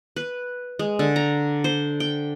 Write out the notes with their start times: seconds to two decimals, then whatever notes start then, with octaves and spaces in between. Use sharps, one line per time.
0.16 B4
0.79 G#3
0.99 D3
1.16 A#5
1.64 C5
2.00 G5